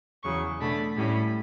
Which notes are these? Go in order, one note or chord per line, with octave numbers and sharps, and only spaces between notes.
E2 C#3 F#3 C#6
B2 A3 D4 B5
A2 G3 C#4 B5